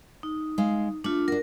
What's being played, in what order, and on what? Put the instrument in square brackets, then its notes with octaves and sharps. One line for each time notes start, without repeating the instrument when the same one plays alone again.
[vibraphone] D#4
[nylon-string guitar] G#3 F5
[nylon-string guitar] A3 [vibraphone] D4 F4
[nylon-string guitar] D4 F#4 [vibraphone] A#4